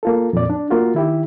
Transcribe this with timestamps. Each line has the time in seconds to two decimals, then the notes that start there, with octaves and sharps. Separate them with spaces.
0.03 A#3 F4 A4
0.33 F2 A#2 D5
0.50 D4
0.70 A#3 F4 F#4
0.94 D#3 E4 G4